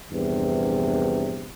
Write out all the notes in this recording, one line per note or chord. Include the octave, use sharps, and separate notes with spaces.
A#1 E2 G2 C3